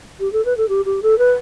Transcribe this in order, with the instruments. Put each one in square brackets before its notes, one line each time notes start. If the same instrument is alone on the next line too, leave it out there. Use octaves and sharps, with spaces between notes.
[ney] G4
A4
B4
A4
G4
G4
A4
B4